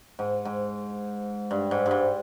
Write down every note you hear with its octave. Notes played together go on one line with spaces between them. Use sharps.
G#2
G#2
G2
G#2
G2
G#2